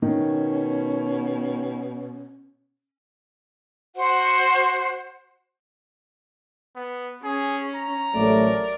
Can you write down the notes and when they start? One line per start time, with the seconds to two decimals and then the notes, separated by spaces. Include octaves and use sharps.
0.02 B2 D#3 C#4
3.96 F#4 C5 F#5
6.76 B3
7.24 C#4 G#4
7.76 A#5
8.15 A1 F#3 A3 A#4 D5